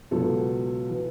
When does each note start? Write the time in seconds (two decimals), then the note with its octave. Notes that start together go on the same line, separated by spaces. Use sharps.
0.11 C#2 B2 F#3 A4
0.89 E3